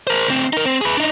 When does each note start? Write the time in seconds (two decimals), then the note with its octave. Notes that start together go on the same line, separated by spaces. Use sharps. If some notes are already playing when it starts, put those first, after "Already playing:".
0.07 A#4 C5
0.28 D2 C4
0.53 D#4 A#4
0.65 C4
0.81 G#4 B4
0.97 D4 D#4